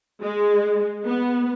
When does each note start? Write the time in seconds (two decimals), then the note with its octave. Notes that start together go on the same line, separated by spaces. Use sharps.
0.22 G#3
1.05 B3